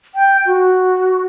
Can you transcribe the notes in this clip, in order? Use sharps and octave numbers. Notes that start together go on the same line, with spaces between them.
G5
F#4